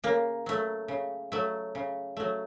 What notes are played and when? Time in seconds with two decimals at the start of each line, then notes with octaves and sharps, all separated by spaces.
0.04 C#3 A#3
0.46 F#3 A3
0.88 C#3
1.32 F#3 A3
1.75 C#3
2.17 F#3 A3